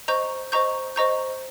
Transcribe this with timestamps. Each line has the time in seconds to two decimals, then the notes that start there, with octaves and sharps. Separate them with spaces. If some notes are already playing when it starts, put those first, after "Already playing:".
0.08 C5 D#5 A#5 C#6 G6
0.52 C5 D#5 A#5 C#6 G6
0.96 C5 D#5 A#5 C#6 G6